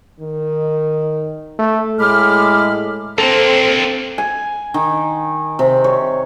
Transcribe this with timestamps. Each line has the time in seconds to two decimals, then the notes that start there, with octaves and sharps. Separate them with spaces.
0.20 D#3
1.59 A3
2.00 A2 G#3 B5 D6 F6
3.18 A#3 C4 D4 A4
4.18 G#5
4.74 D#3
5.59 C3
5.84 C#5